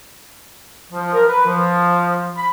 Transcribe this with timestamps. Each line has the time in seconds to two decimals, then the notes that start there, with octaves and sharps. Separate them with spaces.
0.92 F3
1.14 A#4
1.27 B4
1.45 F3
2.37 B5